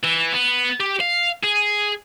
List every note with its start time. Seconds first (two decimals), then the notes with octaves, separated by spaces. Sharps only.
0.03 E3
0.33 B3
0.80 G4
1.00 F5
1.44 G#4